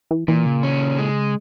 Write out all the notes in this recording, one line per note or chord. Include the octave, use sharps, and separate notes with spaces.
E3
A#2 E3
C#3
C#4
G#3